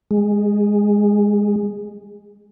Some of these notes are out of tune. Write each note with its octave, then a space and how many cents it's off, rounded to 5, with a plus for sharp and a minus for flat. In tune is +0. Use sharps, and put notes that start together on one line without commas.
G#3 -10